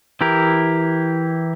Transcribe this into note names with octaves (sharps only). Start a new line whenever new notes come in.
E3 E4 G4 A#4